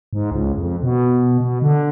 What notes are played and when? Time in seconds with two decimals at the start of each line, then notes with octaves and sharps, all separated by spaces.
0.13 G#2
0.31 C#2
0.58 F2
0.83 B2
1.40 B2
1.62 D3